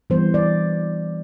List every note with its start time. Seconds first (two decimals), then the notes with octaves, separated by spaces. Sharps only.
0.10 E3 G3 B3 C5
0.34 D5